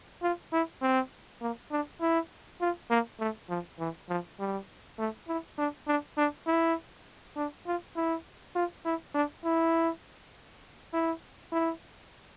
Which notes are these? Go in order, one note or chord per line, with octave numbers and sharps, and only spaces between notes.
F4
E4
C4
A#3
D4
E4
F4
A#3
A3
F3
E3
F3
G3
A3
E4
D4
D4
D4
E4
D4
F4
E4
F4
E4
D4
E4
E4
E4